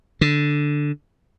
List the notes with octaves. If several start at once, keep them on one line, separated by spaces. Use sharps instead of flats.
D3